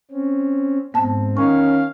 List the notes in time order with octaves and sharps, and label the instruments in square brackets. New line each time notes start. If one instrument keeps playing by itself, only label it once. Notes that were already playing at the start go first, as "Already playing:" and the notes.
[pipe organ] C4 C#4
[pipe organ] G#2 C4 [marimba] B3 A5
[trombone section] D#3 C#4 [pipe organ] F5 [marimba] C#6